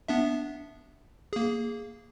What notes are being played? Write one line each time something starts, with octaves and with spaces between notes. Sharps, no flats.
B3 D4 E5
A#3 G#4